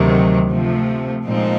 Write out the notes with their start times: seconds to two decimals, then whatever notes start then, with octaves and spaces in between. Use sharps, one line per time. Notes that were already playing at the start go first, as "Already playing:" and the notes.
Already playing: D2 C3 D#3 F#3
0.50 C3 F3 A3
1.25 A#2 F3 G#3 C4 D#4